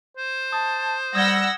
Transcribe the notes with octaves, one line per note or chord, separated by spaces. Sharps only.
C5
A5 D#6
G3 F#5 D#6 E6 G#6 A#6 G7